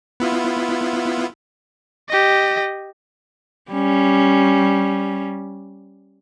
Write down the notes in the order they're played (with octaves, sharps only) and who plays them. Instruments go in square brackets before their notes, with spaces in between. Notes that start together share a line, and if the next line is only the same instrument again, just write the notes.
[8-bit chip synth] B3 E4 F4
[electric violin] G4 D#5
[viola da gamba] G3 C#4